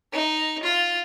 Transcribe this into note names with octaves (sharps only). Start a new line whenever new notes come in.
D#4
F4